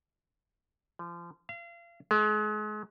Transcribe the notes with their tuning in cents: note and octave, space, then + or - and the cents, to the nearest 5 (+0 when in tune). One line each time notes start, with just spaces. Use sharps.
F3 -30
F5 -35
G#3 +35